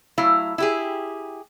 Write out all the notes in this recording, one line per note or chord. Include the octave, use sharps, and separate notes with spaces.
F#3 A3 E4 F5
E4 G4 G#4